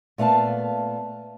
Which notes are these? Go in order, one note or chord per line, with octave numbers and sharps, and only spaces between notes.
A#2 A3 B3 F5 A5